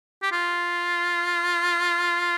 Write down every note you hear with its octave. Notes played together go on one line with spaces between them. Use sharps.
G4
F4